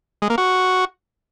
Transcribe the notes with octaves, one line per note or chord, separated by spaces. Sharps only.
G#3
A#3
F#4